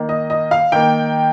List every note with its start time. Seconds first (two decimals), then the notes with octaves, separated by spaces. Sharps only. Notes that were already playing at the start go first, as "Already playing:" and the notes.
Already playing: D#3 A#3
0.09 D#5
0.30 D#5
0.51 F5
0.72 D#3 A#3 G5